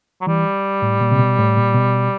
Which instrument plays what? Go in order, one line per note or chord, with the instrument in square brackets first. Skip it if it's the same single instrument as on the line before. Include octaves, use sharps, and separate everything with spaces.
[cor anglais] F#3
[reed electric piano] E3 [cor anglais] G3
[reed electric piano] A2
A#2
C3
B2
A2
A#2
B2